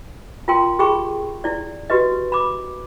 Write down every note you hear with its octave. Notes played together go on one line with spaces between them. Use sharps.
F4 A#4 G5 C6
G4 G#4 G5 B5 C#6
E4 D5
F#4 G4 B4 D#5
B5 D6